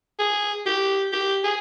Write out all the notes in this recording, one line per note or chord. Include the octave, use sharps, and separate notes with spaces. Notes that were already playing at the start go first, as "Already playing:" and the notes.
G#4
G4
G4
G#4